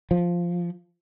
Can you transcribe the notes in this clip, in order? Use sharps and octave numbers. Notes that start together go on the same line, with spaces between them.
F3